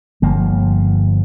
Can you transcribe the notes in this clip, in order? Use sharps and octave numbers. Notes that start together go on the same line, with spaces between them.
G1 F3 A#3